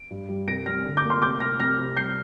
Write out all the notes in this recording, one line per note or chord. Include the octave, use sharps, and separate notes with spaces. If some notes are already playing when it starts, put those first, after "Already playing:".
Already playing: D7
G2
G3
C2 A#6 D7
G3 F6 A#6
D3
D6 G6
A#3
C6 F6
C3 D6 G6
C2 F6 A#6
C2 F6 A#6
C3
G3 G6 C7